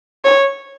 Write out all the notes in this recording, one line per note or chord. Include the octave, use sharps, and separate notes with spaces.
C#5